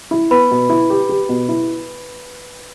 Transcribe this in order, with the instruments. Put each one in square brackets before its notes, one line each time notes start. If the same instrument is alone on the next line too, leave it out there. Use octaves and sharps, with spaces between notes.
[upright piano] E4
[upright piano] B3 [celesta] B4 B5
[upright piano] B2
E4
G4
G4
B2
E4